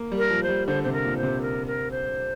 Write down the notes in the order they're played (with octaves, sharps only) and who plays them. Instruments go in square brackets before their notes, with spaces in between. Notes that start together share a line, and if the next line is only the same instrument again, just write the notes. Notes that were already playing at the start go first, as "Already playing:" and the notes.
Already playing: [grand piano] A#3
G3
[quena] A#4
[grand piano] F3
[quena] C5
[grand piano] G3
[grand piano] D3 [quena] C5
[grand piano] C3 [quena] C5
[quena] A#4
[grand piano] A#2
[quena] C5
[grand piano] C3
[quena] A#4
A#4
C5